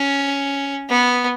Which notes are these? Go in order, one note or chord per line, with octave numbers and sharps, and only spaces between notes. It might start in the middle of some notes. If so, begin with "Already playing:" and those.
Already playing: C#4
B3